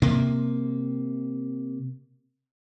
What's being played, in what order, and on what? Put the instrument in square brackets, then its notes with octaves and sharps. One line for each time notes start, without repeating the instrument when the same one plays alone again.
[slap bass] C3 A#3